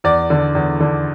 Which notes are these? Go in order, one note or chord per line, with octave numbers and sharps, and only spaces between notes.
E2 D5
D3
E2
D3